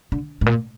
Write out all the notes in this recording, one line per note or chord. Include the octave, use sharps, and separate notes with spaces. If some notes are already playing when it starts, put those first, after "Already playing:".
D3
G#2
A#2